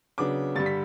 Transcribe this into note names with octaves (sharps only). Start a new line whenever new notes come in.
C#3 F#3 B3 D4 D6
G2 D3 G3 A6
B6